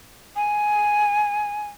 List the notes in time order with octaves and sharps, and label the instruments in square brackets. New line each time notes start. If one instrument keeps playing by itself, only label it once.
[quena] G#5